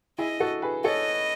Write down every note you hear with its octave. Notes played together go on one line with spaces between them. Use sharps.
E4 G#4 D#5
F#4 A4
G#4 B4
A4 C#5 D#5